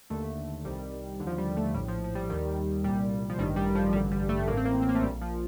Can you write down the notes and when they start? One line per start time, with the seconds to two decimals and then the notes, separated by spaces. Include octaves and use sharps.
0.10 D#2 D3 A3
0.65 C2 C3 D#3 G3
1.20 D#2 D3
1.27 F3
1.38 G3
1.57 A3
1.74 A#1 A2 G3
1.88 F3
2.04 F3
2.15 G3
2.30 D#2 D#3 G3
2.84 C2 A#2 G3
3.30 F3
3.39 A1 G2 D#3 G3
3.56 G3
3.75 F3
3.93 A1 G2 D3 G3
4.11 G3
4.29 A3
4.48 A1 A2 A#3
4.57 C4
4.65 A#3
4.82 C4
4.89 A#3
4.95 A3
5.02 A#1 A#2 G3
5.21 F3